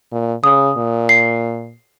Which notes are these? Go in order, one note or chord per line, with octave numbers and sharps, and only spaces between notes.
A#2
C#3 D#6
A#2
C7